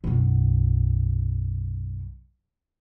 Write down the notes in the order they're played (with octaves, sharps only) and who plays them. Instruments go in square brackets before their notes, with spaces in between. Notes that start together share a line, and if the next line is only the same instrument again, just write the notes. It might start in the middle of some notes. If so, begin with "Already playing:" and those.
[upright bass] B1 F#2